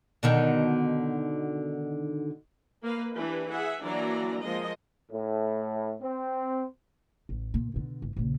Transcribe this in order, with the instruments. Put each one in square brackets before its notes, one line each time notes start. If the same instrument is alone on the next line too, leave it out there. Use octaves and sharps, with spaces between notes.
[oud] B2 D3 D#3
[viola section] A#3 B4 F5
E3 D4 G4 B4
G#4 E5 F#5
E3 F#3 A#3 D4 D5 A#5
F3 G#3 A#3 D#5
[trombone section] A2
C4
[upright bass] A1
A#2
B2 D3
G1
A#1 C#3